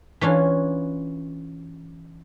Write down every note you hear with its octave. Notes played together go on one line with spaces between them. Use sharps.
E3 C#4 D4 F4